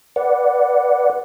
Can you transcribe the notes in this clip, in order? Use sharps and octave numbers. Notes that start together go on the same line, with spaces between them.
B4 D5 F#5